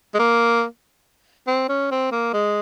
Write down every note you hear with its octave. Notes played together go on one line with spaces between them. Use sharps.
G#3
A#3
C4
C#4
C4
A#3
G#3